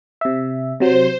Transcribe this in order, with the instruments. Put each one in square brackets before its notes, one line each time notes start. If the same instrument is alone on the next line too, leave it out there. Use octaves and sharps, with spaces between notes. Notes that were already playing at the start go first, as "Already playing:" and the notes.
[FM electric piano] C3 E5
[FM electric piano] C3 F#3 [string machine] C5